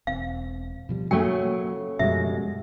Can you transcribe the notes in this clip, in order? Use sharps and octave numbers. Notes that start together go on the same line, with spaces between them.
E1 C4 F5
B2 F3 G3
C#3 F#3 A3 A#3 G5
F#2 B2 F3 G3 G#3 E5